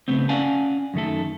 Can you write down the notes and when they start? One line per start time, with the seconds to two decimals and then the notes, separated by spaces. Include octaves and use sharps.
0.08 C#3 A3 B3 C4
0.29 C#4 D5 F5 F#5 G#5 A5
0.94 F#2 D#3 A3 A4